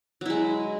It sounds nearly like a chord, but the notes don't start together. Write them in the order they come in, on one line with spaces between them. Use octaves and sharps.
F#3 E4 G#3